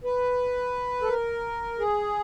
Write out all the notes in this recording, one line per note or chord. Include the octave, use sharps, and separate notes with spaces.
B4
A4
A#4
G#4